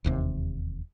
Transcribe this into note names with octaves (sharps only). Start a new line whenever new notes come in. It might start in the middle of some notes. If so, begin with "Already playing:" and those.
E1 D#2 C3